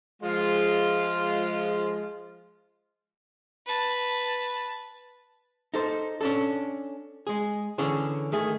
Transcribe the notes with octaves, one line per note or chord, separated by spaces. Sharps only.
F3 G#3 F4
B4 A5
D#4 A4 C5
C#4 D4 A4
G#3 G#4
D3 E3 C#4 D4 G#4
D#3 A3 G#4